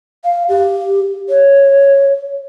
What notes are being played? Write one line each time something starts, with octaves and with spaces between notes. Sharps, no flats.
F5
G4
C#5